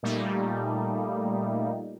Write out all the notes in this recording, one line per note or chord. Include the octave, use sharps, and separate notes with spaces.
A#2 G3 A3 A#3 D#4